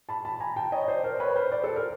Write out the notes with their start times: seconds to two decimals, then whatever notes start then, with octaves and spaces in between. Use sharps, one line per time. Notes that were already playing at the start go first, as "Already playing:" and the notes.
0.09 A5 B5
0.25 A5 B5
0.40 G#5 A#5
0.56 G5 A5
0.72 C#5 D#5
0.88 C5 D5
1.04 A#4 C5
1.20 B4 C#5
1.36 A#4 C5
1.52 C5 D5
1.64 A4
1.76 A#4